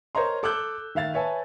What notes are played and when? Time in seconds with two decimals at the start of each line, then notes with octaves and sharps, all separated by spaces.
0.15 A#4 C5 C#5 D#5 A#5 C6
0.43 A4 D6 E6 F#6 G6
0.95 D#3 E5 F5 A6
1.14 B4 C#5 E5 G#5 A5